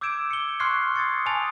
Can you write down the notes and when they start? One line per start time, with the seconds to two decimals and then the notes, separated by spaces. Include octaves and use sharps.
0.01 D6 E6 G6 G#6 D7 E7
0.31 C#7 G7
0.60 C6 C#6 F6 F#6 G#6 C7
0.95 D#6 G#6 A6 C#7
1.26 G#5 A5 D#6 A6 F7